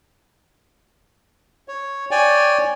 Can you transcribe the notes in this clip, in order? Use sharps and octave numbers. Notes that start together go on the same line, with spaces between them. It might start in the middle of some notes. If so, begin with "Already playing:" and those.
C#5
C#5 D5 G5 G#5